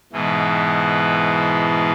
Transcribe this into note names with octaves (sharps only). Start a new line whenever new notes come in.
G#2 B2 E3